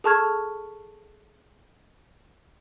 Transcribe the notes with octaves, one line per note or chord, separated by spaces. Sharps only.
G#4 A4 A5 C#6 F6 G#6